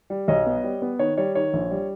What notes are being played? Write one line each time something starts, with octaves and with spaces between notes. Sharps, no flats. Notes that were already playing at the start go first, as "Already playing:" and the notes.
G3
B1 C#5 D#5
B3
G3
B3
D#3 C#5
G3 C#5
D#3 C#5
A#1
G3